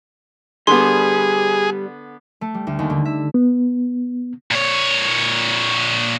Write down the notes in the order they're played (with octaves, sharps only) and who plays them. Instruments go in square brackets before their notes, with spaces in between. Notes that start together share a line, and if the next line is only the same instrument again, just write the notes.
[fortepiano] D3 B3 [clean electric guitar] G3 [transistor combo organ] G#4 [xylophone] C6
[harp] A3
G3
D2
D#2
D3
E5
[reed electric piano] B3
[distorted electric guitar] A#2 C#5